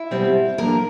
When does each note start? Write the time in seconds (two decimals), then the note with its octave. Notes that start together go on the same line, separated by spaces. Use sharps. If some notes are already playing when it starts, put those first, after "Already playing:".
Already playing: E4
0.11 B2 G3 C4
0.58 A#2 F3 A#3 D4 A#4